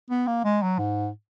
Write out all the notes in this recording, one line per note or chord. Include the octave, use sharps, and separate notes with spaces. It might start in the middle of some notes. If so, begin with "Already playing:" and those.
B3
A#3
G#3
F#3
G#2